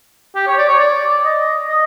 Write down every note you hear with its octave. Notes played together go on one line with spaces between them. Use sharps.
G4
C#5
D5
C#5
D5
D#5
D#5